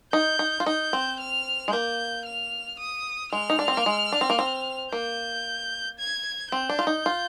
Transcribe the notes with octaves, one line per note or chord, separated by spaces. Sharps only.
D#4 G6
D#4
F4
D#4 G6
C4
F6
G#3
A#3 G6
F6
D#6
G#3 F6
D#4
D4
C4
A#3
G#3
D4
C4
A#3
C4
A#3 G6
G#6
C4 G6
D4
F4
D#4
F4